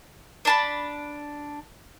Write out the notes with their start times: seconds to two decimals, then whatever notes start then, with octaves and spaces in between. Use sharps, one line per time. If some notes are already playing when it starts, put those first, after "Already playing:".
0.45 D4 A5 B5